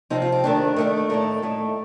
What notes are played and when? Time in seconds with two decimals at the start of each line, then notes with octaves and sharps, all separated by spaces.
0.10 C3 F3 C4 D#4
0.22 F4
0.32 G4
0.44 D#3 A3 D4
0.76 D#3 A3 D4
1.09 A2 A3 D#4 A4
1.42 A2 A3 D#4